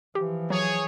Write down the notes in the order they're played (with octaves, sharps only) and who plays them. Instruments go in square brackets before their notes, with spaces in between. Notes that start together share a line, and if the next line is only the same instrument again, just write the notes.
[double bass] E3 F3 [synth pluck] G4
[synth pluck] F#3 [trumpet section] G#4 C#5